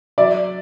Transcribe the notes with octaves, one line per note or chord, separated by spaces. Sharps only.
F#3 D5 E5